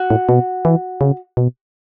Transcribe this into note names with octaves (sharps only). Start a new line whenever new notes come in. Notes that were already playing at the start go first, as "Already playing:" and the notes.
Already playing: F#4
A2
B2
E3
C#3
B2